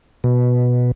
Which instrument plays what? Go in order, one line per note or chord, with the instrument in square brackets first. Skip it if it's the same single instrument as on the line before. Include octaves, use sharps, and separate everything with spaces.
[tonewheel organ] B2